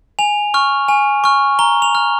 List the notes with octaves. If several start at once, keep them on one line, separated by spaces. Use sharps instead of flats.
G#5 F7
C#6 F6
G#5
C#6 F6
A#5 G7
F7
F6